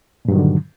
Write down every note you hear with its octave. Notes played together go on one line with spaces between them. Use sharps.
G2 A#2 D3 D#3 F#3